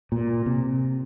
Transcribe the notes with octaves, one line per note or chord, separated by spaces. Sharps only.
A#2
C3